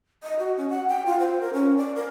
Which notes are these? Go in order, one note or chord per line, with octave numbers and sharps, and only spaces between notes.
D#5
F#4
C#4
F#5
G5
F4
C5
A#4
C#4
D5
A#4